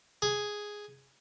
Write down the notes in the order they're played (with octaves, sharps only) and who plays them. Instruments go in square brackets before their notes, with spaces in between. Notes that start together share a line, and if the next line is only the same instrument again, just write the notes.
[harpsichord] G#4